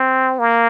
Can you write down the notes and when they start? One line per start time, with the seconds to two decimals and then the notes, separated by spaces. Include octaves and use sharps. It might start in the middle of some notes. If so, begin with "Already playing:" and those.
Already playing: C4
0.39 A#3